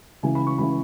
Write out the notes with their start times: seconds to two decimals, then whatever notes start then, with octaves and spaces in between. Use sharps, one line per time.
0.23 C#2 C#3 E3 G#5
0.35 B5
0.47 C#6
0.58 C#2 C#3 E3 B5